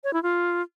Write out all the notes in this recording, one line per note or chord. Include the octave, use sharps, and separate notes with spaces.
C#5
E4
F4